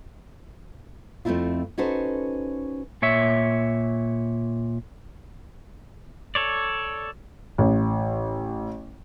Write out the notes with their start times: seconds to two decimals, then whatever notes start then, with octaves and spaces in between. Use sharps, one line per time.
1.25 F2 A3 C4 D4 E4 F4
1.78 C#4 D#4 F#4 A4 B4 C5
3.02 A#2 C#5 E5
6.35 A4 C#5 D5
7.58 A1